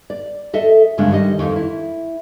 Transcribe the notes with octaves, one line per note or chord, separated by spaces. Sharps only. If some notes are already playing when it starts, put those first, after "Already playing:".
D5
A4 D#5 E5
D2 G2 C#3 G#3 D4
D#3 G3 D#5
F2 D#3
E4